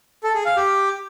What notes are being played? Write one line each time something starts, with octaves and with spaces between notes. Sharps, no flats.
A4
G#4
F5
G4